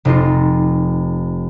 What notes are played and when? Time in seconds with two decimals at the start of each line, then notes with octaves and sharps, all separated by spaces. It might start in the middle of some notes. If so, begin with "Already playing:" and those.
0.05 F1 D#4 F4